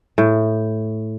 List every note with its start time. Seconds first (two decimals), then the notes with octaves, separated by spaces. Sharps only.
0.18 A2